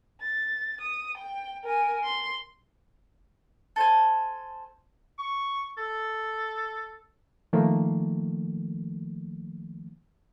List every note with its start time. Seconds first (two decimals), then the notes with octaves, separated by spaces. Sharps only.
0.21 A6
0.81 D#6
1.18 G5
1.64 A#4 G#5
2.04 C6
3.76 A4 C5 G#5
5.19 C#6
5.78 A4
7.53 D#3 F3 A3 A#3